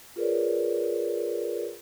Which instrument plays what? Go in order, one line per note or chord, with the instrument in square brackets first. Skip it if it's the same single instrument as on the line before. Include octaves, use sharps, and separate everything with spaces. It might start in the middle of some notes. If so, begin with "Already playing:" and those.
[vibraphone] F4 G#4 A#4 B4 C#5 D5